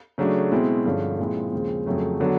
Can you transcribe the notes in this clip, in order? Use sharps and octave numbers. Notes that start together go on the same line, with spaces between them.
C#3 F#3 A3 D4
B2 G#3 C4 E4
G2 D3 F3 G#3 C#4
A#2 F3 G#3 C4 E4
D#2 C#3 F3 G#3 C4
F2 C#3 F#3 A3
D3 F#3 B3 D4